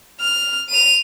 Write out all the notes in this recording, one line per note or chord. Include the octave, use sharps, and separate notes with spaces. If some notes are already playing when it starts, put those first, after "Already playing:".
F6
D#7 F7